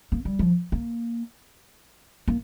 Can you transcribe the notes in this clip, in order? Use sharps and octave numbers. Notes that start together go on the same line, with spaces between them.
A#3
G3
F3
A#3
A#3